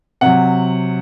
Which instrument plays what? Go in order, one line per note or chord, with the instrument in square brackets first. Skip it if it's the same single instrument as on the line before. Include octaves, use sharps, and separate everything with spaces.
[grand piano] C3 F#3 F#5